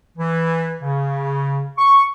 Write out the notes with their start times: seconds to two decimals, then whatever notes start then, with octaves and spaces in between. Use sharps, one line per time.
0.18 E3
0.82 C#3
1.78 C#6